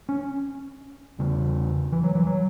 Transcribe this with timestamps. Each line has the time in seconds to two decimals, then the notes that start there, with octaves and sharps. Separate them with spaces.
0.09 C#4
1.19 E2 C#3
1.92 E3
2.03 F#3
2.15 E3
2.27 F#3